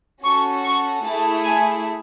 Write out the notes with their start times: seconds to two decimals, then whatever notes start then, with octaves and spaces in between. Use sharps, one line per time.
0.24 C#4 F#4 A4 C#6
0.64 C#6
1.05 A3 E4 G#4 A5
1.45 G#5